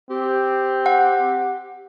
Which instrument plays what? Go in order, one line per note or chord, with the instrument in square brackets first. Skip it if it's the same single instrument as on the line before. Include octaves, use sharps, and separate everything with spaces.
[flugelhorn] C4 [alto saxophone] G4
[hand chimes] F#5